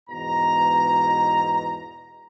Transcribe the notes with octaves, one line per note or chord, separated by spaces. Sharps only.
E2 G#2 B2 A#5